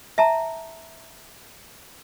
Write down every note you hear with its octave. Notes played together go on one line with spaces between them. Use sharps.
E5 A5 A#5